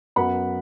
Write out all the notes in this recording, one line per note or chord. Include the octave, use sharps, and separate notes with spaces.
F#2 F#3 B3 F#5 B5